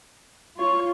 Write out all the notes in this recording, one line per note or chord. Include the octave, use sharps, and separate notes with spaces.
F4 C#5